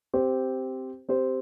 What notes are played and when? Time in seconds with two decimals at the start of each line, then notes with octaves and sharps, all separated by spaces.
0.14 C4 G4 C5
1.09 C4 G4 C5